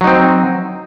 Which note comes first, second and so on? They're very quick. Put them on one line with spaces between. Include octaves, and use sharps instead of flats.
F#3 D#4 C4